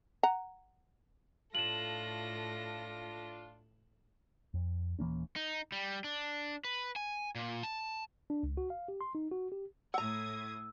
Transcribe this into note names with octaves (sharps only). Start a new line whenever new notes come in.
F#5 A#5
A2 D4 F4 A4 A#6 E7 F#7
F2
D#1 E3 A#3 C#4
D#4
G3
D4
B4
G#5
A#2
A5
D4
C#2
F#4
F5
G4
C6
D#4
F#4
G4
A2 F#5 A#5 D#6 E6 G#6